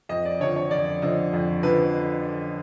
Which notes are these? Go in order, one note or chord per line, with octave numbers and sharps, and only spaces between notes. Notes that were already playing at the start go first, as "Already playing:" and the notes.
F2 D#5
D5
D3 F3 C#5
C#5
F2 D5
D3 F3 D#5
F2
D3 F3 B4